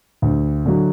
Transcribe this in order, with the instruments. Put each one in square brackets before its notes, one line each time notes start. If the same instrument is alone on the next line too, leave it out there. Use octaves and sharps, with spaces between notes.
[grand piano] D2
D3 F#3